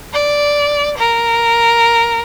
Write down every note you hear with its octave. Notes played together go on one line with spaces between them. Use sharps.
D5
A#4